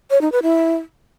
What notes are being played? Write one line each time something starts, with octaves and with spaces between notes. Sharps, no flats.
C#5
D#4
B4
E4